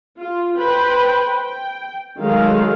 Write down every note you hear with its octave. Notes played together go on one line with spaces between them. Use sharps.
F4
B4 C5 G5
G5
D#3 F#3 G#3 A3 A#4 F5